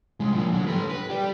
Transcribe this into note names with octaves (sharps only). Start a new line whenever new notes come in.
C2 G#3
F3 A#3
D3 F#3
A4 B4
B4
G4 D5